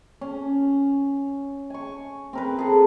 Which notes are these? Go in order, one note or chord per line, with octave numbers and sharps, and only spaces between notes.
C#4
G#5 C#6
C4 A#4 B4
G#4 A4